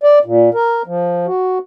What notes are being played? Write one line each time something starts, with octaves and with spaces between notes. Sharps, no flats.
D5
A#2
A#4
F3
F#4